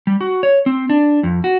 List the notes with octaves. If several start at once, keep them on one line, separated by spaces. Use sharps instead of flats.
G3
F#4
C#5
C4
D4
F2
F#4